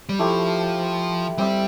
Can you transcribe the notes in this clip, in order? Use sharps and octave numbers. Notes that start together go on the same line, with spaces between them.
G3
F3 A3 E4 G4
G3 C4 G4 C5 E5